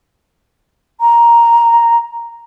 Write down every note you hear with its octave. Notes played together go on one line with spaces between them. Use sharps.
A#5